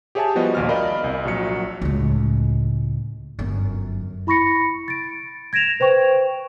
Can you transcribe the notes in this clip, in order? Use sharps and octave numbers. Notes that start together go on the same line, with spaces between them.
G4 G#4 C#5 E5 G#5 A5
F3 G3 B3 F#4 D#5
A#1 D#2 F6
A#4 D5 D#5 F5 B5
C2
A#1 F#3 C#7
C#2 A2
G1 F#2
E4 B5 C#6 A#6 C#7
A6 D7
G#6 A#6 D7 E7 F7
B4 C5 G5 C#6